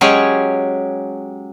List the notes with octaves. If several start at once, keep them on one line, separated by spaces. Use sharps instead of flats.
F#3 G#3 C#4 G4 G#4 C#5